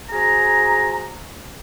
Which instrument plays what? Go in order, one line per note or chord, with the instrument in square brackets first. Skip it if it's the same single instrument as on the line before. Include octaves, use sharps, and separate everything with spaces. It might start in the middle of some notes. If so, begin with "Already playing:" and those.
[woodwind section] F#4 G#4 C5 G#5 A#5